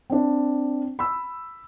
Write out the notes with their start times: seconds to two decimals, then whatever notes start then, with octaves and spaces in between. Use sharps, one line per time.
0.10 C4 D4
0.99 B5 E6